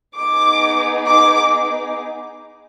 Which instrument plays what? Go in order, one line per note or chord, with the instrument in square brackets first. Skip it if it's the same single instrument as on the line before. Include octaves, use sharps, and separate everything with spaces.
[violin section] B3 D#4 G#4 D6
D6